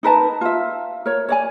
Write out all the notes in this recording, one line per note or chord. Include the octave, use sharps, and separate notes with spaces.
D#4 A#4 B4 A5
F4 E5
A#4 C#5
C#5 D5 G#5